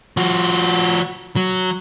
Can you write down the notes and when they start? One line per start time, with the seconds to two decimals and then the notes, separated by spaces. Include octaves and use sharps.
0.17 F3 F#4
1.36 F#3